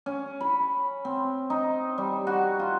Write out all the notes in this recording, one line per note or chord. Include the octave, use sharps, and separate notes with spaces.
C#4
B5
C4
D#4
G3
F#4
F4